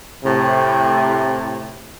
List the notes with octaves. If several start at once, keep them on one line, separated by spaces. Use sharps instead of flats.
A2 C3